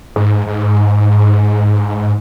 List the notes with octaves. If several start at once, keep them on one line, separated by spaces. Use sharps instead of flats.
G#2
G#2